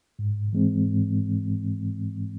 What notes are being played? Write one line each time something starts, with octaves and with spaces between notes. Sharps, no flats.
G#2
E3 G#3 C4
G#2